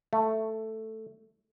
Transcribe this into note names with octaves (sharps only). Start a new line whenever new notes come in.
A3